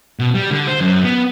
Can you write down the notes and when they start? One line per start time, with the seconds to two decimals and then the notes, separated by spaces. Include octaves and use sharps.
0.19 B2
0.34 G3
0.51 D3
0.67 C5
0.81 F#2
1.04 B3